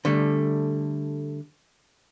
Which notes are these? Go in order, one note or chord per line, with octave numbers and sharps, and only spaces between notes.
D3 G3 A3